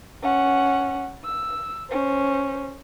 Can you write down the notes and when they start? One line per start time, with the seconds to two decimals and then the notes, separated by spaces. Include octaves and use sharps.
0.23 C#4 F#5
1.24 E6
1.90 C#4 C5